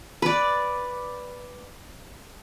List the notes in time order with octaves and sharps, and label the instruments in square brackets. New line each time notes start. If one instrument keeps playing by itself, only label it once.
[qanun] B4 D5